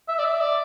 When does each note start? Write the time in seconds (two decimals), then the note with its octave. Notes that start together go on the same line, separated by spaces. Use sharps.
0.08 E5
0.19 D5
0.24 E5
0.40 D5